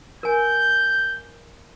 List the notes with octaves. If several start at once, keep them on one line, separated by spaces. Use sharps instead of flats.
A#4 G#5 G6